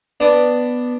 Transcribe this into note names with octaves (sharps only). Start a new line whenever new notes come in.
B3 D4